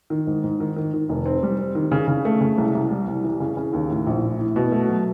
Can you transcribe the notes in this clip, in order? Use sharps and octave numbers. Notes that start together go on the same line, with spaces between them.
D#3
G#2
G#2
D#3
D#3
D#3
F1
C4
G3
C4
D#3
C#3
C#3
A3
C#3
C2
C2
G3
C2
E3
C#3
C#3
D#2
A2
A#1
A2
A2
B2
A3
F#3